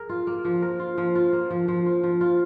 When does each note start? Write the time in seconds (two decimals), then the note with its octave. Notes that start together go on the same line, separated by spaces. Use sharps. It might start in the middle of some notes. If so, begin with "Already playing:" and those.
Already playing: G#4 A#4
0.09 F4
0.27 A#3
0.45 F3
0.62 A#4
0.79 F4
0.98 F3
1.15 F4
1.33 A#3
1.50 F3
1.68 F3
1.86 F4
2.03 F3
2.21 F4